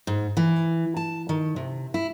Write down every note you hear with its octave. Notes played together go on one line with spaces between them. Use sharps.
G#2
E3
A5
D#3
C3
E4